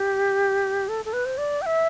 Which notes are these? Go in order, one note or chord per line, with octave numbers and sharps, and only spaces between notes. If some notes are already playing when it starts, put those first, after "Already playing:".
Already playing: G4
A4
A4
B4
C5
D5
G5
E5